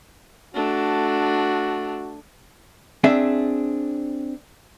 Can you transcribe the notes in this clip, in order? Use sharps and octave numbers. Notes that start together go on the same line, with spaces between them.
A3 D4 F#4
C4 D4 G#4 E5